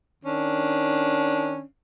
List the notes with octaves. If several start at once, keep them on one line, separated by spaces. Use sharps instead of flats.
D#3 C#4 D4